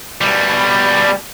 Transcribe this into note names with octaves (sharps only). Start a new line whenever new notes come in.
B2 G3